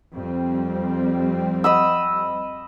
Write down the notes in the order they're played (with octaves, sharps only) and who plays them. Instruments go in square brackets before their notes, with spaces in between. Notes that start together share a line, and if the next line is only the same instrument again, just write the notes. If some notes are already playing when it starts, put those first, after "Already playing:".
[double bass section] F2 G3 C4
[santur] D#5 B5 E6